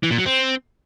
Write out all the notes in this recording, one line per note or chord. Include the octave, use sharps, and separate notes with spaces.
E3
A#2
F#3
C4